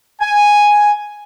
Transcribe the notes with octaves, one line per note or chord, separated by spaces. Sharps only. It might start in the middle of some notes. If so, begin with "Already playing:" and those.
G#5